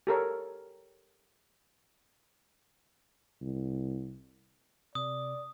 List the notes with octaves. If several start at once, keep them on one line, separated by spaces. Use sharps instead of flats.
G4 A4 A#4 C#5
C2
C3 D5 D#6